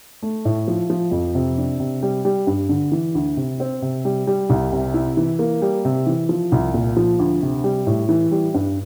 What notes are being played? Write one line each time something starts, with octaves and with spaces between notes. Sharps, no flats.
A3
A2
F3
F3
F2
C3
D4
C3
G3
G3
G2
D3
E3
D2
C3
C4
C3
G3
G3
C2
C3
E4
E3
A#3
G3
C3
E3
F3
C2
A#2
F3
D2
C3
G3
A2
E3
G3
G2